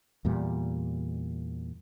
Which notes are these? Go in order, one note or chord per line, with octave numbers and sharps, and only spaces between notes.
E2 A#2 G3